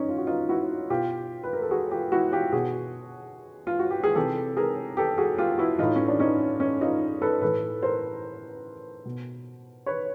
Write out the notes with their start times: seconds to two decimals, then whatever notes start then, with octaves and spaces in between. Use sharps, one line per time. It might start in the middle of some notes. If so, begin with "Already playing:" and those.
Already playing: C#4 D#4
0.09 F4
0.18 F#4
0.27 D#4 F4
0.49 E4 F#4
0.90 B2 F4 G4
1.44 B4
1.53 A#4
1.62 A4
1.71 F#4 G#4
1.91 F4 G4
2.12 E4 F#4
2.32 F4 G4
2.52 B2 F#4 G#4
3.67 F4
3.79 F#4
3.91 G4
4.04 G#4
4.15 C3 E3 G4 A4
4.57 G#4 A#4
4.97 G4 A4
5.18 F#4 G#4
5.38 F4 G4
5.58 E4 F#4
5.79 A2 E3 D#4 F4
5.96 C#4
6.08 D4
6.20 C#4 D#4
6.60 C#4 D#4
6.81 D#4 F4
7.22 A4 B4
7.41 A2 E3 A4 B4
7.83 A#4 C5
9.05 B2
9.86 B4 C#5